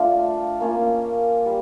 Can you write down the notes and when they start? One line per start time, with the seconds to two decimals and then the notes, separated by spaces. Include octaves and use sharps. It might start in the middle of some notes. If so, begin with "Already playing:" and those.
Already playing: A3 D4 F4
0.60 A#3 C#4 F4
1.46 G3